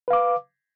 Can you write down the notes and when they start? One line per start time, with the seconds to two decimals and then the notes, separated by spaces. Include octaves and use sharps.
0.08 B4
0.10 F5
0.13 D6